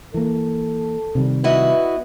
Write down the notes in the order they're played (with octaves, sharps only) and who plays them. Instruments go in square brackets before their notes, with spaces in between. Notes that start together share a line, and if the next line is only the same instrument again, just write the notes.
[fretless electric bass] E3 A#3 [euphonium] A4
[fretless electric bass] C3 D#3 G3
[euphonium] B3 [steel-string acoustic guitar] E4 F#4 D#5